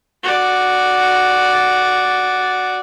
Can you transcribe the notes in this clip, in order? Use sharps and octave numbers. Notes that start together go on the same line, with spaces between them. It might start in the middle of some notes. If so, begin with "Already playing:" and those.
F#4 D5